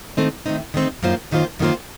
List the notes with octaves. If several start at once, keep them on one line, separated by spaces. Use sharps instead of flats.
D#3 A3 C4 D#4
D#3 A3 C4 D#4
D#3 A3 C4 D#4
F#2 D#3 A#3 F4 C5
F#2 D#3 A#3 F4 C5
F#2 D#3 A#3 F4 C5